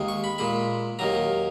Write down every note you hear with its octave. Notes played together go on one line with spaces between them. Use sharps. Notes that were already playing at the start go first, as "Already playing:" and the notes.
Already playing: D#2 D#3 G#3
C#6
B5
A#2 G#3 B5
D#2 D#3 F#3 A#5